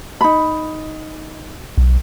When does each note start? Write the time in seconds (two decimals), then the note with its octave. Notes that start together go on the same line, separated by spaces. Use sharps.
0.21 D#4 B5
1.78 B1